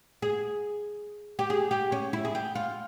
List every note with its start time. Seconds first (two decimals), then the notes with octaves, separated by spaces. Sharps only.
0.22 G#4
1.39 G4
1.50 G#4
1.71 G4
1.92 C#4
2.13 E4
2.25 G#4
2.35 G4
2.55 F4